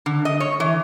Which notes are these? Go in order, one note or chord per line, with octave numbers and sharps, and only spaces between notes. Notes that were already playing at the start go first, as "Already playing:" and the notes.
D3
D#5
C#5
E3